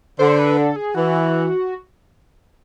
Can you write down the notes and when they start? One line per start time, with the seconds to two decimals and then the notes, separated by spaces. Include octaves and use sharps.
0.19 D3 C5
0.39 B4
0.57 A4
0.76 G#4
0.95 E3 F#4